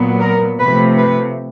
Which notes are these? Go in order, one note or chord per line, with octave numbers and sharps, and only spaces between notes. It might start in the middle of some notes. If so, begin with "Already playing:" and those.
Already playing: A#2 F#3 B3
A#4
C3 F3 A3 B4
B4